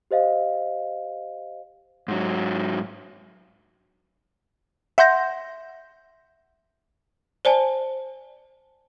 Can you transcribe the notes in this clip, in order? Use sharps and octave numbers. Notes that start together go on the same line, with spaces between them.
G4 C5 D#5 F5
G#2 F#3
E5 F#5 C6 G6 A#6
C5 D5 G#5 A5